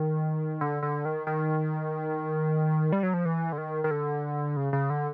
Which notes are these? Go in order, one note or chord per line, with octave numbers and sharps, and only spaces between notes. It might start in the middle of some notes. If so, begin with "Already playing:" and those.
Already playing: D#3
D3
D3
D#3
D#3
G3
F#3
F3
E3
D3
D#3
D#3
D3
C#3
C#3
D3